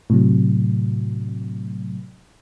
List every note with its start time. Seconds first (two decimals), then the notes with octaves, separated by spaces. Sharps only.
0.10 A2 C3 F#3